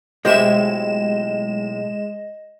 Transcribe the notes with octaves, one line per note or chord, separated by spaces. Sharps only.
B1 A2 G#3 G4 C5 D#5 E5 E7